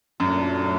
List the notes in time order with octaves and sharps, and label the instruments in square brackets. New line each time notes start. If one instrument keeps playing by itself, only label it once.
[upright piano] F#2 [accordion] A#2 F#3 A3 D4